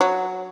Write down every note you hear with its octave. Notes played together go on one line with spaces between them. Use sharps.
F#3